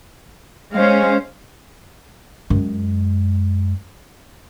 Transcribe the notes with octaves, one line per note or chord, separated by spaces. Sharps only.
G#3 C#4 C5 F5
F#2 G#3